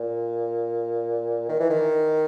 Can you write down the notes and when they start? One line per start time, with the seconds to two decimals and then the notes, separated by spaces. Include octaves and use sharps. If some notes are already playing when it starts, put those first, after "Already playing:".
Already playing: A#2
1.49 D#3
1.60 E3
1.70 D#3